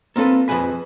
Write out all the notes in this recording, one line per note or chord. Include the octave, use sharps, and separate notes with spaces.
A#3 C4 F4 A4 B4
F2 G#4 B4 G#5 B5